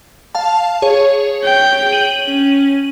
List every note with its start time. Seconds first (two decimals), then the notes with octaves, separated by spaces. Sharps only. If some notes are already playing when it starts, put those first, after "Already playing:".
0.35 F5 A5
0.82 G#4 C#5
1.44 G5
1.92 D#7 F#7
2.27 C#4